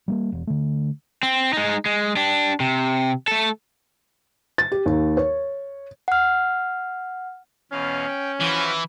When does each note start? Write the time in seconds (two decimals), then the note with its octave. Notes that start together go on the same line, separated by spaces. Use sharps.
0.08 G3 A3 A#3
0.32 E1
0.47 D3 A3
1.23 C4
1.53 G#3 D#4
1.86 G#3
2.16 D4 G4
2.60 C3
3.28 A3 A4
4.58 A6
4.72 G4
4.86 D#2
5.17 C#5
6.08 F#5 F6
7.72 E2 B2 C#4 F5
8.08 G5
8.41 E3 F3 F#4 B4